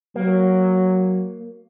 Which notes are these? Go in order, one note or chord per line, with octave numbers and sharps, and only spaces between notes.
F#3 A#3